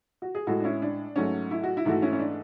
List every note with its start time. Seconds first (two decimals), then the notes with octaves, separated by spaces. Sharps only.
0.22 F#4
0.35 G#4
0.47 A2 G#3 F#4 A4
0.60 D4
0.64 C#4 E4
0.82 D4
1.16 G#2 F#3 A3 C#4
1.51 E4
1.64 F#4
1.77 E4
1.85 G#2 E3 A3 F#4
2.02 C#4 E4
2.13 C#4
2.20 D4